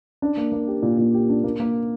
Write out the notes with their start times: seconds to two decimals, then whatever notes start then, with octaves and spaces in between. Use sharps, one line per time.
0.22 D4
0.37 A#3
0.52 A#3
0.68 G4
0.82 A#2
0.98 A#2
1.14 G4
1.29 D4
1.44 A#3
1.60 A#3